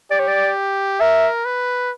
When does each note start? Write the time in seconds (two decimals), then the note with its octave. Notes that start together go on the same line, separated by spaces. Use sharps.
0.11 G4 D5
0.20 C#5
0.28 D5
1.00 A#4 E5
1.45 B4